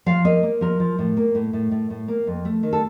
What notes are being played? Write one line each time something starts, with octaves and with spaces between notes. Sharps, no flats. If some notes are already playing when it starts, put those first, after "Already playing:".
F3 F5
A#3 D#5
A#3
F3 A#4
F3
A2
A#3
A2
A2
A2
A2
A#3
F2
A3
D#3
A4